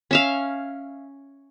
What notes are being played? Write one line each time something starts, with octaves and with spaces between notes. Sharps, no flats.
C#4 E5 F5